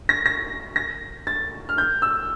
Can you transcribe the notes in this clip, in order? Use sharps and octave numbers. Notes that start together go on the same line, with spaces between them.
A#6
A#6
A#6
A6
F6
G6
E6